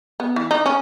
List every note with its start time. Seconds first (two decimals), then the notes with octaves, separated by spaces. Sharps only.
0.20 B3
0.36 E3
0.51 D#4
0.66 C#4